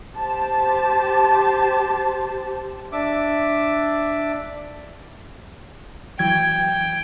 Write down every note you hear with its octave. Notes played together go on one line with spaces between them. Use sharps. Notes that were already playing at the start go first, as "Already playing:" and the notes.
G4 C5 A5
D4 E5 D6
E3 F#3 G5 G#6